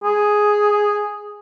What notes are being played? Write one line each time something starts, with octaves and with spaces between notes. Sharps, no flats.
G#4